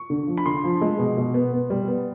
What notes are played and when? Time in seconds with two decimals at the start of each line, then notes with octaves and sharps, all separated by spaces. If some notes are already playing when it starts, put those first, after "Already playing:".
Already playing: C#6
0.10 D3
0.27 F3
0.37 B5
0.46 D3 C6
0.64 F3
0.81 G#3
0.99 B2
1.17 B2
1.34 B3
1.53 B3
1.70 G3
1.88 B3